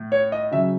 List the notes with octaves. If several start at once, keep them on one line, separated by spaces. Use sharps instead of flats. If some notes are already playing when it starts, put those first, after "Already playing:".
Already playing: A2
C#5
D#5
C#3 F#3 E5